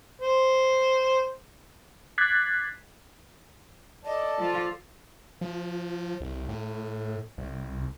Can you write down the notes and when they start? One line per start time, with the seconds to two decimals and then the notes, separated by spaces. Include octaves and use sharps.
0.22 C5
2.18 D6 F#6 G#6 A6 B6 C7
4.05 A4 D5 D#5 A5
4.38 F3 F4
5.41 F3
6.21 C2
6.49 A2
7.38 C2